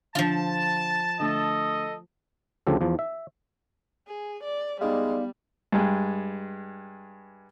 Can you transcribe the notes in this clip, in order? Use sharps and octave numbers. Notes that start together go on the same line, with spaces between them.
D3 F3 F4 A5
D3 A3 A4 D#5
D2 C#3 F3 G4 A4
E2 F3
E5
G#4
D5
G3 G#3 B3 D#4 D5 F5
G2 G#3